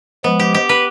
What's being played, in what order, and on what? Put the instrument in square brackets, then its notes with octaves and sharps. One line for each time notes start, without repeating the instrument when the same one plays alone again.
[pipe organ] F3 G#3 [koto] B3
[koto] G4
G4
B4